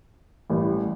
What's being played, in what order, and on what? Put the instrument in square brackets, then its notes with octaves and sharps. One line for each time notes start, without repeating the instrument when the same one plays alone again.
[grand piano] A1 A2 G3